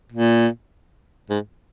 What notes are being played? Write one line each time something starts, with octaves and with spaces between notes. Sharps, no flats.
A#2
G#2